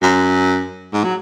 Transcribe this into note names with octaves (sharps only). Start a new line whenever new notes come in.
F#2
G#2
F#3